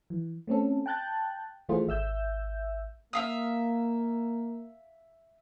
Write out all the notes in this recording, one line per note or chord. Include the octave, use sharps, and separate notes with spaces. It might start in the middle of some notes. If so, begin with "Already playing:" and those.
E3
A3 C4 C#4 A4
G5 A5 F#6 G6 A6
D#3 E3 A3 F4 G#4 C5
G#1 E5 E6 G6
A#3 E5 F5 D#6